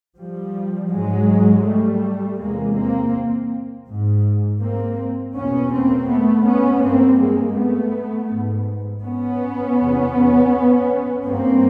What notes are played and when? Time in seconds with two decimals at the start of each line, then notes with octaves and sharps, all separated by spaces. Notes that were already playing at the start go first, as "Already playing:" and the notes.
0.18 F3 G3
0.92 G#2 F#3 G#3
1.66 G3 A3
2.40 E2 C3 G#3 A#3
2.76 A#3 C4
3.88 G#2
4.61 A#3 C4
5.35 E2 B2 B3 C#4
5.72 A#3 C4
6.09 A3 B3
6.45 B3 C#4
6.82 G2 A#3 C4
7.19 G#3 A#3
7.56 A3 B3
8.30 G#2
9.04 B3 C#4
9.78 E2 C3
11.25 G2 A#3 C4